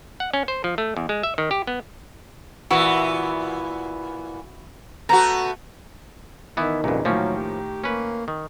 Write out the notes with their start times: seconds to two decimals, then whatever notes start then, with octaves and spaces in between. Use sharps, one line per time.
0.20 F#5
0.33 C#4
0.48 C5
0.64 F3
0.78 A3
0.97 E2
1.09 G#3
1.23 E5
1.38 D#3
1.51 G4
1.67 B3
2.71 A#2 E3 B3 E4 F#4 E5
5.09 A3 B3 F#4 A#5
6.57 D#3 E3 B3 E4
6.84 C2 F2 A#2 C#3 B4
7.05 A2 D#3 F3 F#3 A#3 C#4
7.36 G4
7.84 A#3 C#4 B4
8.28 D#3